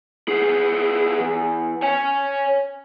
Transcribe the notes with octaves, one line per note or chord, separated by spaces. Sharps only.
B3 G#4
E2
C#5 G#5